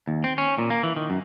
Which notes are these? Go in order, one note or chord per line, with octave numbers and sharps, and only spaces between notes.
D#2
C4
C#4
A#2
A#3
E3
D#3
F#2